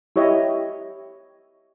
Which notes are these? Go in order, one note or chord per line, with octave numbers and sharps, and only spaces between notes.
E4 G4 C#5 D#5 E5